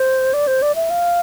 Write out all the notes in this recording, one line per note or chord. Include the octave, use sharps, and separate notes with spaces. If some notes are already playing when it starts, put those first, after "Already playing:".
Already playing: C5
D5
C5
D5
E5
F5